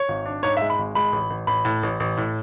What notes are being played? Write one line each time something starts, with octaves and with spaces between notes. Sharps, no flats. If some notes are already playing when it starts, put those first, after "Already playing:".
Already playing: C#5
G#1
D4
G#2 C#5
E5
G#3
B5
G#1
G#3 B5
A1
A1
A1 B5
A2
A1
A1
A2